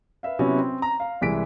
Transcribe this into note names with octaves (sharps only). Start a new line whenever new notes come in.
B4 E5 F5
C3 F#3 B3 C#4 E4 F#4
C4
A#5
F5
C2 E3 G#3 B6 D7